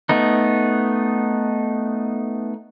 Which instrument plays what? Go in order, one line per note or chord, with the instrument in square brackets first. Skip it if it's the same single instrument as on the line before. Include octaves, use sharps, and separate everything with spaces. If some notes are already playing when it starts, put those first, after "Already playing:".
[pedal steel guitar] A3 B3 D#4